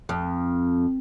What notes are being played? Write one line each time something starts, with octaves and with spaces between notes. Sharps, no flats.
F2